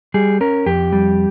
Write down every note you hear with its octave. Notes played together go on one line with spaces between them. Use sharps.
G3 G#4
C#4 A#4
F2 G4
G3